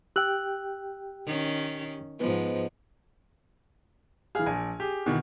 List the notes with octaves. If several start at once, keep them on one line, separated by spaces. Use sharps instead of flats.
G4 G5 E6 F#6 F#7
D#3 C#4
G#2 F3 G#3 B3 D#4
E3 G#4 F5 F6
A#1 G#5
G4 G#4
B2 D#3 E3